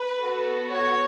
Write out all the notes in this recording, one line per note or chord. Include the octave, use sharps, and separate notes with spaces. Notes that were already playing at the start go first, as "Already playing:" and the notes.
Already playing: B4
B3 F#4 A4
C#5